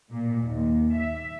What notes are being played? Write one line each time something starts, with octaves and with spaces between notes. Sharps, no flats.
A#2
D#2
E5